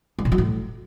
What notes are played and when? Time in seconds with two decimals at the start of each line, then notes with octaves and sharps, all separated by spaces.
0.19 G3
0.25 A#2
0.32 F#3
0.38 A2